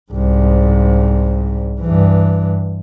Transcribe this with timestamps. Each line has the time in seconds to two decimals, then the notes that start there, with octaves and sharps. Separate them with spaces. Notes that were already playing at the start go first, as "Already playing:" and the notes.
0.12 C2 G#2
1.81 G2 E3